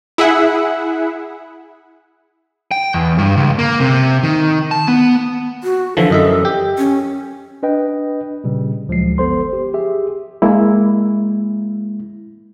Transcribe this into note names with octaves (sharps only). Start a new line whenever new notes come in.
E4 G#4 E5 F#5
G5
E2
G2
C#2
A#3
C3
D#3
A5
B3
F#4
D3 E3 F3 A4
F#2 D#5 E5
G4
C#4
D4 B4 D#5 G5
A#2 C#3 G3
D2 F3 F#3 G#3 C7
G1 B3 A4 C5 C6
G4
G4 G#4 E5
G#3 A#3 E4